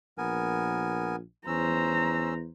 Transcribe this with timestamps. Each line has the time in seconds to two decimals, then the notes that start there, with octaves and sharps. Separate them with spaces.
0.18 A#1 B3 A#4 G#5
1.47 E2 C#4 C5 A#5 E6